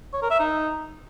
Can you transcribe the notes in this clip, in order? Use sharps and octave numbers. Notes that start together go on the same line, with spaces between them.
C#5
A#4
E5
D#4